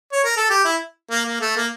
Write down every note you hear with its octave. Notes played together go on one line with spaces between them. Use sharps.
C#5
A#4
A4
G4
E4
A#3
A#3
A3
A#3